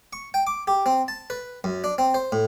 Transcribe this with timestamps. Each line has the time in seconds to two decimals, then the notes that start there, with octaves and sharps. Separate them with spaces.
0.13 C#6
0.34 G5
0.47 D6
0.67 G4
0.86 C4
1.08 A5
1.30 B4
1.64 F#2
1.84 D4
1.98 C4
2.14 C5
2.32 A2